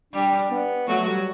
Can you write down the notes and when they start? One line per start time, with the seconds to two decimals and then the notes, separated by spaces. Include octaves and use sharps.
0.13 G3 D4 G4
0.51 B3
0.88 F#3 A3 F#4
1.07 G3